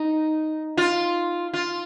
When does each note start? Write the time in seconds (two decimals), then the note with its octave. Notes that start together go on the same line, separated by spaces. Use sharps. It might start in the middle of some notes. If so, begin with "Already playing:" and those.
Already playing: D#4
0.77 F4
1.54 F4